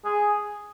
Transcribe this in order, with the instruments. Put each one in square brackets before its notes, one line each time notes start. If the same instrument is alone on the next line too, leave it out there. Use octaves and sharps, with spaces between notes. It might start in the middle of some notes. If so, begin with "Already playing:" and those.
[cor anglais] G#4